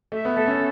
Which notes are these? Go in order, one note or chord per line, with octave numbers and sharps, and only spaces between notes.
A3 E5
B3
A3 A4
C#4